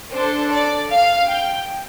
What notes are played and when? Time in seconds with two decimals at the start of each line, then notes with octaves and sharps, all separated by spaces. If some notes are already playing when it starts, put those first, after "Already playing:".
0.11 D4 A4 C5
0.50 D5
0.90 F5
1.30 G5